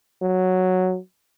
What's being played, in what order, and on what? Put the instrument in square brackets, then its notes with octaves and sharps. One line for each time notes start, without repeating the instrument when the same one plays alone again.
[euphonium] F#3